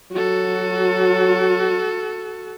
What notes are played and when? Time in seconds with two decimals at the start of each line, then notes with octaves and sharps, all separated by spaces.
0.12 F#3 F#4 A4